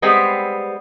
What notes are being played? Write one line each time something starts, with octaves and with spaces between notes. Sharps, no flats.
G3 G#3 B3 C4